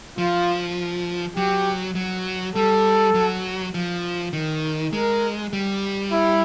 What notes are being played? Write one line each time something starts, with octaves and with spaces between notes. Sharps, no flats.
F3 F4
F#3 G4
F#3
G3 A4
F#3
F3
D#3
G#3 A#4
G3
E4